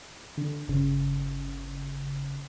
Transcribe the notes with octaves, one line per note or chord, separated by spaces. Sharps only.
D3
G1 C#3